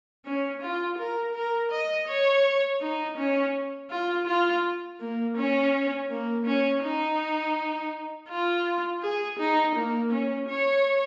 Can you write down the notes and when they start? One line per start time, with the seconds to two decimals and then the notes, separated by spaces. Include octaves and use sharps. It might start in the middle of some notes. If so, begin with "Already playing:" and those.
0.25 C#4
0.62 F4
0.98 A#4
1.35 A#4
1.71 D#5
2.07 C#5
2.81 D#4
3.17 C#4
3.90 F4
4.27 F4
5.00 A#3
5.37 C#4
6.10 A#3
6.46 C#4
6.83 D#4
8.29 F4
9.02 G#4
9.39 D#4
9.75 A#3
10.12 C#4
10.49 C#5